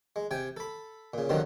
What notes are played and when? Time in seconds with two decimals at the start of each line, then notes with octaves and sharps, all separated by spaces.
0.16 G#3
0.31 C3 G5 G#5
0.57 A4 B5
1.14 A#2 C#3
1.29 G2 B2 D3 D#3 F#3 C4